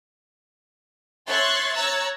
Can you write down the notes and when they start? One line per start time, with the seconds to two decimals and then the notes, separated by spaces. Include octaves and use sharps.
1.26 C#5 E5 C6 C#6 F#6 A6
1.75 C#5 A#5 E6 F#6 A6